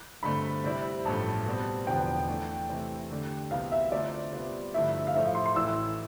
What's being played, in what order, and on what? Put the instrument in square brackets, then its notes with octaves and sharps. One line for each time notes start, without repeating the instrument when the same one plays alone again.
[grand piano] G2 D3 A3 C4 [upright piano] B5
[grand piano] C3 G3 C4 E4
[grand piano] A1 G2 F3 A3 [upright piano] A5
[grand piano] B2 G3 C4
[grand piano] E1 E2 D3 F3 B3 [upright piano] G5
[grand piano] E3 A3 D4
C3 E3 A3
D3 A3 D4 G4
[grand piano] C2 C3 E3 B3 [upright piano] F5
[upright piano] E5
[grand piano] D3 A3 C4 F4 A4 [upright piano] D5
[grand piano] C3 G3 B3 F4
[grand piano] G2 D3 F3 A3 E4 [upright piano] E5
[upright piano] F5
[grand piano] A2 F3 A3 [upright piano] E5
[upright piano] F5
C6
C6
[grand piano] A1 A2 E3 A3 E4 [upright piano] E6